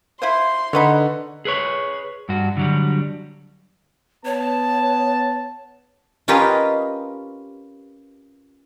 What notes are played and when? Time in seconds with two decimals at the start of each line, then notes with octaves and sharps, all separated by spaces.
0.22 E4 F4 C5 C6
0.73 D3 D#4 B4 C#5 F#5
1.45 G#4 B4 C#5
2.29 G2 F#4
2.57 D3 F#3 G3
4.25 B3 C#5 A5
6.28 C#4 F4 G4 A#4 B4 D#5